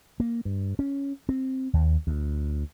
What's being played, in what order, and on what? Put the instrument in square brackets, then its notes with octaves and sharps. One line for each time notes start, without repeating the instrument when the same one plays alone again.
[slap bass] A#3
G2
C#4
C4
D#2
D2